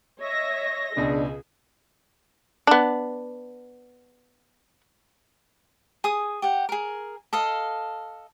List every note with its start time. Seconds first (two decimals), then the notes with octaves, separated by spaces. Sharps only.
0.21 C#5 D#5 E5 A#6
0.97 C#2 B2 D4 G#4
2.67 B3 D4
6.04 G#4 D#6
6.42 G4 F#5
6.69 G#4 A#4
7.33 A4 D#5 F5